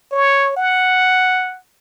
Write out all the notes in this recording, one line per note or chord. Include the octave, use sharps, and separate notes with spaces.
C#5
F#5